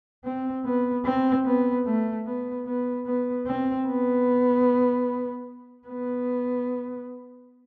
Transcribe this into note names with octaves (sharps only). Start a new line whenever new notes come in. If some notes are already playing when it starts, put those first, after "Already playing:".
C4
B3
C4
B3
A3
B3
B3
B3
C4
B3
B3